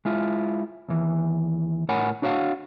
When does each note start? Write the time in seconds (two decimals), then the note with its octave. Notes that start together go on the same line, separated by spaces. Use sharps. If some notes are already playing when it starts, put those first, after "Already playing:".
0.05 G#3 E4 F4
0.89 D#2 E3
1.89 A2 A#4 C#5 F#5 G#5 B5
2.22 D4 F#4 C#5 D#5 F5 F#5